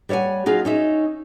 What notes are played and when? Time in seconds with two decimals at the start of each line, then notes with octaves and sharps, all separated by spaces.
0.09 G3 C#5 E5 F#5 G#5
0.46 F#3 D#4 F4 G#4
0.65 C#4 D#4 E5